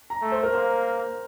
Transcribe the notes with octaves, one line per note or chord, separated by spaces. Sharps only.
A#5
A3
C5
A#4
A#3 C5